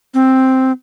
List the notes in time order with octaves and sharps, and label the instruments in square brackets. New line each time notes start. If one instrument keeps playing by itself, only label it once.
[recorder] C4